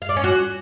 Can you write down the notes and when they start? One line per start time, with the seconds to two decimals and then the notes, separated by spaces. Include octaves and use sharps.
0.02 F5
0.09 D5
0.16 C#4
0.24 F#4